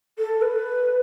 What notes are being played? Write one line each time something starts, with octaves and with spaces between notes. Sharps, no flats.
A4
B4